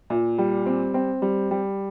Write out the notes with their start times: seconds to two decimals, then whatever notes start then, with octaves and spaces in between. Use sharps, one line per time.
0.10 A#2
0.38 G3
0.66 C4
0.94 C4
1.22 G3
1.51 G3